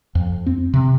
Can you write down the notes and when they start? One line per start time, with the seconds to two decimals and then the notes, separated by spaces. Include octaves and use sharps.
0.15 F2
0.46 C4
0.74 C3